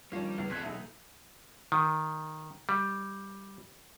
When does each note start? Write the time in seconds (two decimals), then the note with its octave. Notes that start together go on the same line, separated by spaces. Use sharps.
0.12 D#3 F3 G3 A#3 C#4 D4 C#5 F5
0.38 C#2 E3 B3
0.50 C3 A4 F#6 G#6 B6
0.63 B1 G#3 A#3 D#4 A4 E5
1.72 D#3
2.69 G3